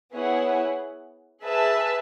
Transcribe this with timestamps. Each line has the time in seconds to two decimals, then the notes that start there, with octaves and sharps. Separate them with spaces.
0.14 B3 E4 G#4 C#5 F#5
1.44 G#4 B4 E5 A5